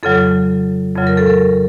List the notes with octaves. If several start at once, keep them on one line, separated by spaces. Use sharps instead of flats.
F2 C#3 F#3 A4
F2 C#3 F#3
A#4
A4
A#4